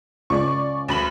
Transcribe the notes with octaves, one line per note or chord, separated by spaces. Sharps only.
C#2 D5 C#6
D2 B5 F#7